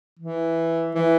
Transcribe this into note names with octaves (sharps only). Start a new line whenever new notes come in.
E3
E3